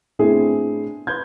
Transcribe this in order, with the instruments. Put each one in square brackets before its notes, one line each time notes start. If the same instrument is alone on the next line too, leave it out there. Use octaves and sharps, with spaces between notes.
[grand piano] A2 B3 C4 D4 E4 G#4
B4 B5 C6 G6 G#6